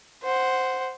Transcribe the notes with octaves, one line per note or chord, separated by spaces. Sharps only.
C5 F#5